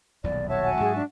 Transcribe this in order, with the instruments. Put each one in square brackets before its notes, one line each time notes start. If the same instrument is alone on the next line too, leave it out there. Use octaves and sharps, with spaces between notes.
[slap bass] D#1 B1 E2 [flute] D5
[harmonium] F#4 E5 A5 [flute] C#5
[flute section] F#5 G#5
[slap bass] G#2 F#3 [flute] G#4
[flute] D4